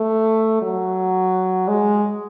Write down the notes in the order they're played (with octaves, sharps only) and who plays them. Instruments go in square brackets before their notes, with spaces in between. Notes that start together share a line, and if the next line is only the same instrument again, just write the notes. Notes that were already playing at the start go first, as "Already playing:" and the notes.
Already playing: [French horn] A3
F#3
G#3